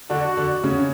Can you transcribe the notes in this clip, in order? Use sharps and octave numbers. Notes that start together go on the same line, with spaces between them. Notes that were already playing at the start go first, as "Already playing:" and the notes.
D3 D4 F#4
D3 D4
C#3 C#4